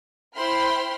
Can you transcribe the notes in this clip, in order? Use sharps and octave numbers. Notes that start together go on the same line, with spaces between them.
E4 C5 G5 B5 C6 F6